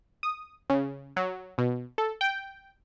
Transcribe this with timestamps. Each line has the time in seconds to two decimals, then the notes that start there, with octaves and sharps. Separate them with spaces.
0.23 D#6
0.70 C#3
1.16 F#3
1.58 B2
1.98 A4
2.21 G5